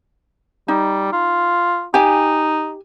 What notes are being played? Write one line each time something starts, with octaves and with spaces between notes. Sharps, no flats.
G3 D#4
F4
D#4 G4 G#5